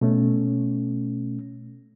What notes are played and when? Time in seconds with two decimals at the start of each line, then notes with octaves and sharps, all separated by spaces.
0.01 B2 A3 C#4